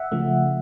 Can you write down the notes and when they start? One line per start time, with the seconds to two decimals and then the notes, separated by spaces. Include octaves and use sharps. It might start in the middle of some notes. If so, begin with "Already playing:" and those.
Already playing: E5 F#5
0.12 C#3 F3 A3